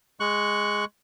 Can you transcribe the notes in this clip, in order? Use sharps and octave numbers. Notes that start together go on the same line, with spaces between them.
G#3 C#6 F#6